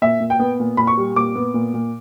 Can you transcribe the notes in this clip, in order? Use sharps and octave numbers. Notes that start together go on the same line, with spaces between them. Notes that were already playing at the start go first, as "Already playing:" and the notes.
A#2 E5
A#2
G5
B3
A#2
A#2 B5
C#6
G3
A#2 D6
B3
A#2
A#2